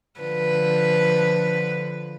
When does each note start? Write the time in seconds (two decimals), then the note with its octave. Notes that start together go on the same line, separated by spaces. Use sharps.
0.21 D3 F3 B4